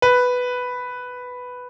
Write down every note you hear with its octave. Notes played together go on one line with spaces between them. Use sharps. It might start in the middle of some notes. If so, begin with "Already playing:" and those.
B4